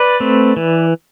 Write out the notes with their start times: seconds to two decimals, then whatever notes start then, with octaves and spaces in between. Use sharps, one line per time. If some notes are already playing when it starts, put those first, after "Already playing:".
Already playing: B4 D5
0.20 A3 C4
0.57 E3